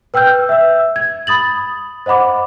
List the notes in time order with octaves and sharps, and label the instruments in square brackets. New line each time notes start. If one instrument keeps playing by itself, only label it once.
[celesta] B4 G5 E6 F6 G6
E5 E6
G#6
B5 D#6 A6 F#7
C5 D#5 F#5 B5 D6